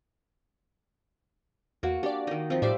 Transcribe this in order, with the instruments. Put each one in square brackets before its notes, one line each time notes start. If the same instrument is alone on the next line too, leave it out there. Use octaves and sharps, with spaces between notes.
[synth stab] E2 [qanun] A#3 F#4
[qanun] D4 [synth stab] G4 D5
[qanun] D#3 D#4
[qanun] F3 D#4 [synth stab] C4
[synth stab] A2 D5 [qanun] G3 C5 E5